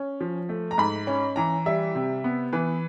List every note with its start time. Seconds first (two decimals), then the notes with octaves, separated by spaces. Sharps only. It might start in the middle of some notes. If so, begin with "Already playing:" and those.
Already playing: C#4
0.21 F3
0.49 A3
0.71 A#5
0.78 G#2 B5
1.07 C#4
1.36 E3 A#5
1.66 G3 E5
1.95 C3
2.24 B3
2.53 E3 B4